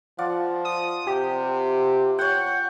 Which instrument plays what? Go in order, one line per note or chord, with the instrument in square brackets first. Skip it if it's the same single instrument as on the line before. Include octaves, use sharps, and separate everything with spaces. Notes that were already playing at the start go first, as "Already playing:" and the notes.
[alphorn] F3 [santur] F4 D5 F#5
[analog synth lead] D#6
[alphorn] C3 [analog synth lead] G4
[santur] C#5 G5 [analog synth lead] F#5